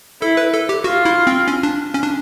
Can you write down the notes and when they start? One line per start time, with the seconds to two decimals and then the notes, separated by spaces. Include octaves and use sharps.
0.22 E4 A4
0.37 B4
0.54 A4
0.69 G4
0.84 F4 F#4
1.05 E4
1.27 C4
1.48 C#4
1.63 D4
1.94 C#4
2.03 D4